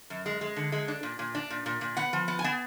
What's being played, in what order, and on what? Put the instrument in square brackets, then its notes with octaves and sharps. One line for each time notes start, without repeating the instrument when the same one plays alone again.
[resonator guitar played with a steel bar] F#2
G#3
G#3
D3
G#3
D4
A#2
A#2
D4
A#2
A#2
A#2
B3 F#5
F3
B3
G#5
B3